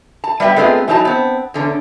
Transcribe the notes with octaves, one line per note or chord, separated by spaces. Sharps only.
A5
G3 B3 D#5 E5 G5
G#3 A3 B3 C4 F4 G#4
E3 F#3 D#4 G#4 A5
B3 C4
E2 D3 C#4